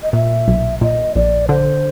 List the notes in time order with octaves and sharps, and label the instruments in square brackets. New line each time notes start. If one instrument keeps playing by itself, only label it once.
[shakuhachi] D#5
[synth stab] A#2 [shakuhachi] E5
[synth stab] B1
[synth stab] A#2 [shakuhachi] D#5
[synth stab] A#1 [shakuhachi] D5
[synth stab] D3 [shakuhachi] C5